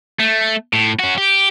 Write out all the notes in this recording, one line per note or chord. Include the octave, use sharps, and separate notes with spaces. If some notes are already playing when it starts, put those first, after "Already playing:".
A3
A2
C#4 F#4
G4